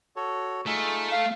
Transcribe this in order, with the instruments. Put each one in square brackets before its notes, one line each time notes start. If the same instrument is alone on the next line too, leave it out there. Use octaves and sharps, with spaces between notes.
[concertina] F#4 A4 C#5
[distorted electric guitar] A3 [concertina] D#4 F4 G#4
[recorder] F5